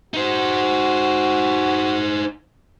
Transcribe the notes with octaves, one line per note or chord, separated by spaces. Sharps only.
D#4 F#4 C5